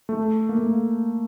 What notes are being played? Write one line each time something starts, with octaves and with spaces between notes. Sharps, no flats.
A3
A#3
A3